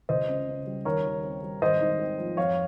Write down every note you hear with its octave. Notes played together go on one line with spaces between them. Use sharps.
C#2 C5 D#5
C#3
C#4
G3
D#2 A#4 C#5
D#3
C4
G3
G#1 C5 D#5
G#2
C4
F3
F2 C#5 F5